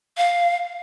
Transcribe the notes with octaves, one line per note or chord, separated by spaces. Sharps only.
F5